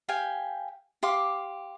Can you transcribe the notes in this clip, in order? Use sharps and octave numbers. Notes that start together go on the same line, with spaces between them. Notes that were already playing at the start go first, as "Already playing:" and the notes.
G4 F5 G5 G#5
G4 F5 C6 D6